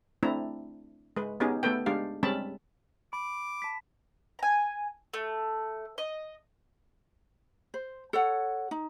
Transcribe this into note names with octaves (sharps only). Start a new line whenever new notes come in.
A3 C4 D4 E4 A#5
G#3 B4
B3 C#4 D#4 G4 G#4
A3 B3 A4 B4 G5
G#3 D4 G4 F5
G3 G#3 C4 C#4 A5 B5
B5 D6
A5 B6
G#5 A#5
A3
D#5
C5
A4 C#5 F#5
D#4